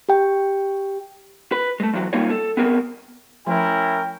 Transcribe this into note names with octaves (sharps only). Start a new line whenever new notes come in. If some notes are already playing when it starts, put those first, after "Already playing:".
G4 G5
B4
G#3 A3
E2 E3 F#3
G3 A#3 C4 D#4 F4 C#5
A4
B3 C4 G#4 A#4
F3 A3 C#4 E4 A#4 G5